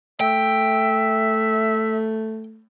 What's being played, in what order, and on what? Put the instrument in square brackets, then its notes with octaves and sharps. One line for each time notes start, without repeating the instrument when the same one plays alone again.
[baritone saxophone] A3 [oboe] E5 [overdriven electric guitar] G5